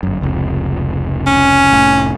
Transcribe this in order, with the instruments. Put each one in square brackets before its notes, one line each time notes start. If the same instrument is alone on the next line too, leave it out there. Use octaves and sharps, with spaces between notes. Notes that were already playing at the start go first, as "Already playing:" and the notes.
[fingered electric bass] G1 F#2
F1 C#2
[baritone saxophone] C#4
[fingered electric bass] F1 A2